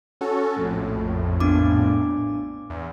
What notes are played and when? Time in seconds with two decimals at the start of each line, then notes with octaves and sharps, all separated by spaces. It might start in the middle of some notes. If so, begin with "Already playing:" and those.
0.21 C#4 F#4 A4
0.57 A#1 F2 A2
1.40 B3 D4 D6
2.70 E2